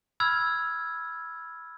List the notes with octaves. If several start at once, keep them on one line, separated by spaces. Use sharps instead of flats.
B5 E6 F6 G#6